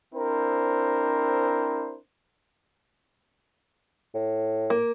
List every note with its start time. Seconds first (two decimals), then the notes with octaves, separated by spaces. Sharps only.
0.14 C4 D4 E4 A#4 C5
4.14 A2
4.70 A#3